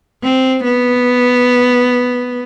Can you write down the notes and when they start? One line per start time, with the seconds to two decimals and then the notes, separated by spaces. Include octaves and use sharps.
0.24 C4
0.64 B3